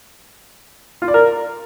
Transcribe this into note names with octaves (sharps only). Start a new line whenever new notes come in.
F4
D5
A#4